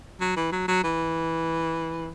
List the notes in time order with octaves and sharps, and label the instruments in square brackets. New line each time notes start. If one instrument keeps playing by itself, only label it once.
[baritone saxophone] F#3
E3
F#3
F#3
E3